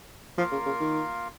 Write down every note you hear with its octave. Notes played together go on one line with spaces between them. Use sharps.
F3 A#3 F4 A#4 F5
C#3
C#3
D#3